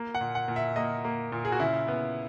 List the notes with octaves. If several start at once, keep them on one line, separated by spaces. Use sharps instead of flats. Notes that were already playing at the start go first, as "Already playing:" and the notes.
Already playing: A#3
F#5
A#2
F#5
A#2
E5
A#3 D#5
A#3
A#2
G#4
F#4
C#3 E4
B3